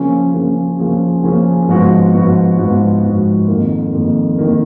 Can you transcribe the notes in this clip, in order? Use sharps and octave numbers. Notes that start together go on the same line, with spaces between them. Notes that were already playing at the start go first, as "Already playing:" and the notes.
Already playing: C#3 F3 A#3 C#4 G#4
C#3 F3 A#3 C#4 G#4
C#3 F3 A#3 C#4 G#4
C#3 F3 A#3 C#4 G#4
G#2 F3 B3 F#4
G#2 F3 B3 F#4
G#2 F3 B3 F#4
G#2 F3 B3 F#4
F2 D#3 A#3
F2 D#3 A#3
D#3 A#3